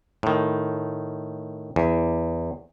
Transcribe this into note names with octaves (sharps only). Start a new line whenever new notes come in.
A2 D#3
E2